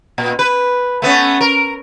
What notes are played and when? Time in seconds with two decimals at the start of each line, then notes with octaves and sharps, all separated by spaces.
0.18 A#2
0.39 B4
1.02 A3 B3 C#4
1.41 A#4